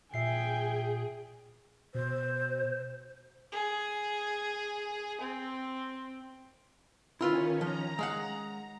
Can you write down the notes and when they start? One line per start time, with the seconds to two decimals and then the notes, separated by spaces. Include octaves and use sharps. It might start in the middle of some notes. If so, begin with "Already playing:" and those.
0.14 A#2 G#4 E5 G5 G#5 C7
1.94 B2 C5
3.52 G#4
5.21 C4
7.21 D#3 C#4 E4 F4 B4
7.61 F3 A#5
7.99 G#3 F5 F#5